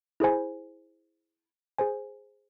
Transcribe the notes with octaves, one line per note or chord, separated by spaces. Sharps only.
E4 G#4 C5 G#5
G#4 C5 G#5